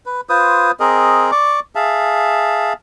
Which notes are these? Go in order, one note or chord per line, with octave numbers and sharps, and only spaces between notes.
B4
F4 B4 C5 D#6
C4 G#4 A#4 D#5
D5 C#6 D6
G#4 E5 F5 A5